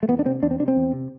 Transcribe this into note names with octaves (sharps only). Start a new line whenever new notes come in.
A3
E2 B3
D4
C3 C4
E2 D4
C4
C3 D4
C4
E2
C3